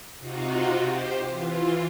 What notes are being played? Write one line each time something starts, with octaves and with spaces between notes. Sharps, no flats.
C3 D#4 F4 F#4
G4 C5
E3 F4